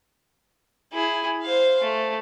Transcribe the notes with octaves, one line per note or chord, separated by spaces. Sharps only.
E4 G#4
C5 F5
A3